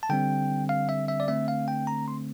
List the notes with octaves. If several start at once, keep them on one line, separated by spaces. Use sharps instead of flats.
A5
D3 G3 C4 G5
F5
E5
E5
D5
D3 A3 C4 E5
F5
G5
A#5
C6